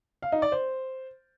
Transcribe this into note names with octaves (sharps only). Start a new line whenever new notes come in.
F5
D#4
D5
C5